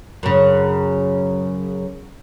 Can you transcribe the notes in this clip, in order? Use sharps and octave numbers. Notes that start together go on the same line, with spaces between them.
F#2 C#3